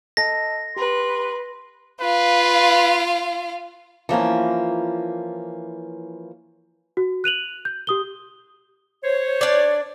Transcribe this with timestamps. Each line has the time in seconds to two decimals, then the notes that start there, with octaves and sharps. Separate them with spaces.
0.17 A4 D#5 A5 A#6
0.76 G4 B4 C6
2.00 F4 B4 F5
4.09 E3 F3 A#3 C#4
6.97 F#4
7.24 F#6 D#7 F7 F#7
7.65 G6
7.87 G4 D#6 G7
9.04 C5 C#5
9.41 D4 D5